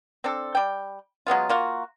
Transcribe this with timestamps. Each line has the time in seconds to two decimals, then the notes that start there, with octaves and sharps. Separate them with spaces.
0.24 C4 D4 A4
0.55 G3 G5
1.27 F#3 G#3 B3 F4
1.49 A#3 F4 F#4